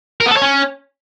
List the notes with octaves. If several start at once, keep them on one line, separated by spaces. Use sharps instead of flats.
A#4
B3
A4
C#5
C#4